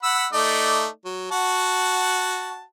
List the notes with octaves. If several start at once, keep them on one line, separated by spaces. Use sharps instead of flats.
F#5 B5 E6
A3 D#4 D5
F#3
F#4 F#5 A5